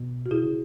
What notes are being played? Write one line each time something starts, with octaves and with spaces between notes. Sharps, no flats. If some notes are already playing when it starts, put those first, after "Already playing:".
Already playing: B2
F#4
B2 E4 G#4
C#3